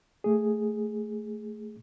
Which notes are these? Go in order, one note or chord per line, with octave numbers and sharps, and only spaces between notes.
A3 G#4